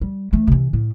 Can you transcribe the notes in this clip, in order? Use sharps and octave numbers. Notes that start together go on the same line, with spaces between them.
G3
E3 A3
C3 E3
A2